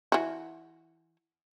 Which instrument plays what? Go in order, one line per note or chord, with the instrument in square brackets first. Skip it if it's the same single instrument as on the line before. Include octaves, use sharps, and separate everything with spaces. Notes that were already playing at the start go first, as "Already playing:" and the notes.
[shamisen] E3 F#4